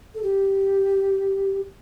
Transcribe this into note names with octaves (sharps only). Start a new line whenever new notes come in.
A4
G4